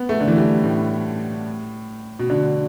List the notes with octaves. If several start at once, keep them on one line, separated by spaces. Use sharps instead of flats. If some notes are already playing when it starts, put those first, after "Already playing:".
Already playing: B3
A3
D3
E3
G3
A2
B2
D3